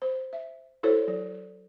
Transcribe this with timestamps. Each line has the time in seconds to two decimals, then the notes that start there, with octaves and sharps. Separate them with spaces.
0.02 C5
0.33 E5
0.83 E4 F#4 A4 C5 C#5
1.08 F#3